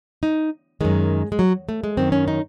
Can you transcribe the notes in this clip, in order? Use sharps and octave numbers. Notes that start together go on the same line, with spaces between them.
D#4
F#2 D#3 G#3
G#3
F#3
A3
G#3
F#2 D#3 C4
C#4
D#4